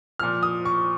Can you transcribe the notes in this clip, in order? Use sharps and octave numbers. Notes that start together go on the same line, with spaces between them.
A#2 F3 F6
D#6
C#6